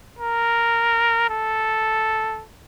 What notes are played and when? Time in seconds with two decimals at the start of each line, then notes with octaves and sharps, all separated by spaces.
0.19 A#4
1.30 A4